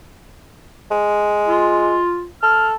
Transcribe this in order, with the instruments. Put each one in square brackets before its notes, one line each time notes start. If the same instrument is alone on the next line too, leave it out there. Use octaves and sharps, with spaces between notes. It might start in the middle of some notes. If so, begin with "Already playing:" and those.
[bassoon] G#3
[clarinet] F4
[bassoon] A4 [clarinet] F6